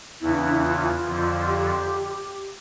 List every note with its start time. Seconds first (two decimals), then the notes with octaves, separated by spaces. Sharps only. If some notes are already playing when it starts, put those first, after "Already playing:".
0.21 E2 C#3 E3 E4
0.32 D4
0.43 D4
0.52 E4
0.63 F4
1.04 F2 D3 F3
1.46 G4